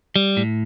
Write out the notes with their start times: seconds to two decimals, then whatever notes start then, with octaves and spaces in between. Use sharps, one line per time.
0.16 G3
0.37 A2